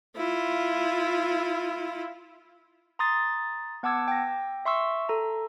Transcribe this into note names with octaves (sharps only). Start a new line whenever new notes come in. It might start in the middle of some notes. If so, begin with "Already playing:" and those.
E4 F4
A#5 C6 D#6 A6
B3 F#5 A5 D6 E6 G#6
G5 A#6
E5 C6 C#6 E6
A4 A#5